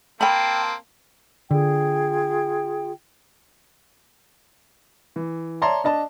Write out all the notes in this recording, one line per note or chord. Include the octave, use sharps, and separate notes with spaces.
A#3 C4 G5 A5 B5
D3 F4 G#4 G5
E3
C#5 D5 E5 A5 A#5 C6
D4 D#5 A5